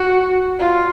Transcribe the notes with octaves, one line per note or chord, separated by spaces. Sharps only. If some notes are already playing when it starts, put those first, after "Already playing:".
Already playing: F#4
F4